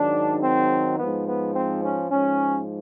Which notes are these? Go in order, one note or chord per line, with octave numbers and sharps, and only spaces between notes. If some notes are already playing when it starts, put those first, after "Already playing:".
Already playing: G#2 D#3 F#3 D4
C4
G#2 F3 B3
B3
C4
C#4
G#2 F3 C#4